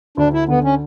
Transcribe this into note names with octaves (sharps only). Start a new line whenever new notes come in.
D2 D4
E4
D3 B3
C#4